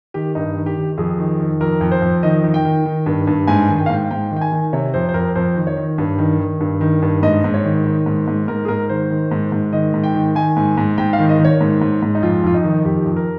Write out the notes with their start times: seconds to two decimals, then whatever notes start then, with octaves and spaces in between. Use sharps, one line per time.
0.14 D#3 G4
0.35 G2 D#4
0.56 D#3
0.66 G4
0.77 D#3
0.98 F2 G#4
1.18 D#3
1.40 D#3
1.61 F2 A#4
1.81 F2
1.91 C5
2.02 F2
2.23 D#3 D#5
2.44 D#3
2.54 G5
2.65 D#3
2.85 D#3
3.06 G2
3.27 G2
3.47 G#2 G#5
3.69 D#3
3.79 G5
3.86 F5
3.90 G#2 G5
4.11 G#2 G5
4.31 D#3
4.36 G5
4.41 G#5
4.52 D#3
4.73 C3 C#5
4.94 F2 C5
5.09 C5
5.14 F2 A#4
5.36 F2 C5
5.56 D#3
5.67 C#5
5.77 D#3
5.98 G2
6.18 D#3
6.39 D#3
6.60 G2
6.81 D#3
7.02 G2
7.23 G#2 D#5
7.44 G#2
7.54 C#5
7.64 D#3
7.86 D#3
8.06 G#2
8.27 G#2
8.48 G#2 A#4
8.65 G#4
8.68 G#2 A#4
8.89 D#3 C5
9.10 D#3
9.31 G#2
9.52 G#2
9.73 D#3 D#5
9.94 G#2
10.03 G5
10.15 D#3
10.35 D#3 G#5
10.57 G#2
10.77 G#2
10.98 G#2 G5
11.13 F5
11.19 D#3
11.29 D#5
11.39 D#3
11.45 C#5
11.61 G#2
11.81 G#2
12.02 G#2
12.15 D#4
12.23 F2 F4
12.44 F2 F4
12.54 D#4
12.64 D#3
12.85 F2 G4
13.06 F2
13.16 A#4